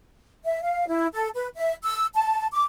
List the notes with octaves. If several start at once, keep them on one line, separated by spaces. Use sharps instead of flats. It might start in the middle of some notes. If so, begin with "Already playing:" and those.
E5
F5
E4
A4
B4
E5
E6
A5
D6